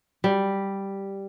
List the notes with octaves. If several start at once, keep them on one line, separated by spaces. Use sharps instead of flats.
G3